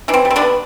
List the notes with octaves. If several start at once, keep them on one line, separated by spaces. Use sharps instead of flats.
E3 D4
C4
G3
C4
D3 D4
B3